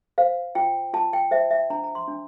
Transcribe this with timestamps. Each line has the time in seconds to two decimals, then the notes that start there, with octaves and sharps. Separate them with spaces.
0.18 C5 F5
0.55 F4 G5
0.94 F4 A5
1.13 G5
1.31 C5 E5
1.51 E5
1.70 D4 A#5
1.84 A#5
1.95 C6
2.08 D4